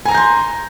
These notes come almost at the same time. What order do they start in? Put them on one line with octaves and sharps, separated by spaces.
G#5 A#5 A#6 G6 C6